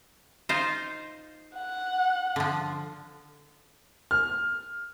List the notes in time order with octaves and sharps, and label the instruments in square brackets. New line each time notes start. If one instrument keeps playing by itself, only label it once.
[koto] D#4 F4 C5
[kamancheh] F#5
[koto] D3 F3
[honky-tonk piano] F6